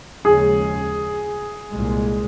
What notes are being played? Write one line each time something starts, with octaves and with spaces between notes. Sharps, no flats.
D#2 C#3 F3 G#3 C#4 G#4
C2 A#2 G#3